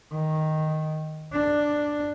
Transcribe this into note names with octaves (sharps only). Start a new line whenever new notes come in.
D#3
D4